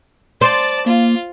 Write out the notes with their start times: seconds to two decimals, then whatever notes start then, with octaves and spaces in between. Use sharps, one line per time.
0.41 C5 D5 A5
0.86 A#3 F4